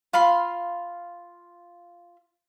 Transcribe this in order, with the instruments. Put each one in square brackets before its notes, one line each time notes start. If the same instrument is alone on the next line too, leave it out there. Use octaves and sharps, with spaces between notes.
[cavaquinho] F4 F5 B5 C6